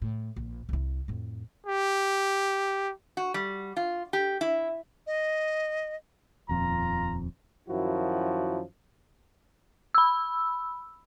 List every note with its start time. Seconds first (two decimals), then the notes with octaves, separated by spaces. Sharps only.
0.02 A2
0.36 A#1
0.69 C2 E4
1.08 F2 A2
1.66 G4
3.17 F#4
3.34 G3
3.77 F4
4.13 G4
4.41 E4
5.07 D#5
6.49 D#1 F2 F4 A#5
7.69 F#2 D#3 F3 E4 F#4
9.95 B5 E6